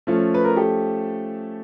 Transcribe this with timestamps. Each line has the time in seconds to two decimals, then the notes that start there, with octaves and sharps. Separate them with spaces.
0.07 F3 A3 C#4 F4
0.34 B4
0.45 A#4
0.56 G4 A4